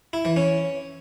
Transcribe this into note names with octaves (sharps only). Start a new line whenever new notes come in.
E4
E3
C#4